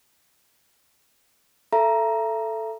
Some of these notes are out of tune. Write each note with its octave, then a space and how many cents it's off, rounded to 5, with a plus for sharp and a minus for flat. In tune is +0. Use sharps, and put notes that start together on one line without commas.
A4 +0 E5 +30 A#5 +10